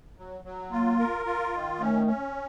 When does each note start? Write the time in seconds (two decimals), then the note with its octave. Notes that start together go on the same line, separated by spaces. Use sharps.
0.17 F#3
0.44 F#3
0.72 A#3 F4
0.99 A#4
1.26 F4
1.53 D#3
1.80 A3 C#4
2.07 C#4